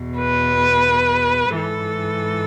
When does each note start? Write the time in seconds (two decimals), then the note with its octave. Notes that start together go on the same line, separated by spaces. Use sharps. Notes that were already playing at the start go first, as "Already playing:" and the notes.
Already playing: E2 B2
0.18 B4
1.55 G#2 E3 A4